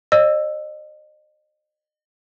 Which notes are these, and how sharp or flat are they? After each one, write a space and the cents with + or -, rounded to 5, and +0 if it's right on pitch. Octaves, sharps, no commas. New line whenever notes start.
C5 +45 D#5 -40 E6 +5